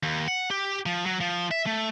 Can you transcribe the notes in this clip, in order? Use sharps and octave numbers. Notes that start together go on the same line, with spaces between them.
D#2
F#5
G4
F3
F#3
F3
E5
A3